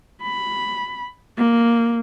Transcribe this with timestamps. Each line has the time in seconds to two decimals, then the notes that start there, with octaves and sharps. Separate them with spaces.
0.22 B5
1.37 A#3